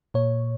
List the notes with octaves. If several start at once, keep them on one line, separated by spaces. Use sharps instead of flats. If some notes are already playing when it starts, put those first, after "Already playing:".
A#2 C#5